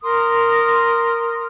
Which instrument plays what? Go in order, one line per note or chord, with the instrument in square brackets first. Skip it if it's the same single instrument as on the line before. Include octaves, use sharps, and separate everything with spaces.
[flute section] A#4 C6 D#6